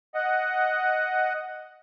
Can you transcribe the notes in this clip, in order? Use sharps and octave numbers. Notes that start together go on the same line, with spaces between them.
D#5 F#5